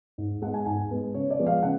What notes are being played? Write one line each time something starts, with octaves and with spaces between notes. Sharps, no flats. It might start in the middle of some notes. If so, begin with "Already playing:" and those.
G#2
G#3 B3 F#5
G#5
G#2 G#5
G#3 B3
C#3 C#5
D5
F3 G#3 B3
F5
C#3 F#5